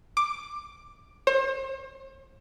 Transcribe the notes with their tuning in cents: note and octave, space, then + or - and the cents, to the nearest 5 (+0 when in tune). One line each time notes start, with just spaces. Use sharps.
D6 +10
C5 +40